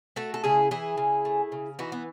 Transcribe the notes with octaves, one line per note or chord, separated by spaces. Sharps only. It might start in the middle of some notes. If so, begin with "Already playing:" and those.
A3 F#4 A4
A4
C#3 E4 G#4
E3 E4 G#4
C#3
A3
C#3
E3 D#4 F#4
B3